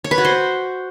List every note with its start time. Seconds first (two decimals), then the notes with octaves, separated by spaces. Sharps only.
0.04 C#5
0.11 B4
0.18 F#4
0.25 C5